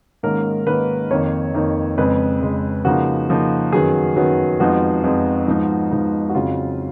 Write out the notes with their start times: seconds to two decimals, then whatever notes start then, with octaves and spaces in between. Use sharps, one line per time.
0.23 G#2 D#3 A#3 C#4 A#4
0.66 G#2 D#3 A#3 C#4 B4
1.10 F2 D#3 A#3 D#4 C#5
1.54 F2 D#3 A#3 D#4
1.98 F2 C#3 G#3 B4
2.42 F2 C#3 G#3
2.85 C#3 F3 A#3 D#4 F#4
3.30 C#3 F3 A#3 D#4
3.72 F#2 D#3 F#3 B3 G#4
4.16 F#2 D#3 F#3 B3
4.60 F2 F3 G#3 B3 D#4 F#4
5.04 F2 F3 G#3 B3 D#4
5.47 G#2 F3 B3 D#4
5.92 G#2 F3 B3 D#4
6.29 F#4
6.35 F2 C#3 F#3 F4